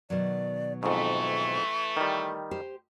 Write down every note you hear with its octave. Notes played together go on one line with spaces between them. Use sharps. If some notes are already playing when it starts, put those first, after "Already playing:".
B2 D#3 F#3 D5
F2 G#2 E3 A3 C#6
D#3 G3
G4 C5